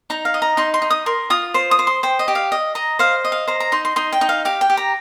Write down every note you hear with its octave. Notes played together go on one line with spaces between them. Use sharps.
D#4 A#5
F5
D#5
A#5
D#4 C6
C6
D#4
D#6
A#4 C6
F4 D#6
C5 C6
D#6
C5
C6
C5 G5
D#5
G4
F5
D#5
D#5 A#5
C5 F5
D#5
F5
C5 A#5
A#5
D#4 C6
C6
D#4 C6
G5
D#4
F5
G4 F5
G5
G4
A#5